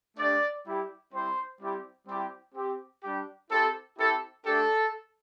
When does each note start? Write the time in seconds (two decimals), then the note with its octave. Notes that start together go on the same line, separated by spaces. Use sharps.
0.17 A3 D4 G4 D5
0.65 G3 E4 G4
1.12 G3 C4 E4 G4 C5
1.60 G3 C4 E4 G4
2.07 G3 C4 E4 G4
2.55 C4 G4
3.02 G3 D4 G4
3.50 C4 E4 G4 A4
3.98 C4 E4 G4 A4
4.44 A3 D4 G4 A4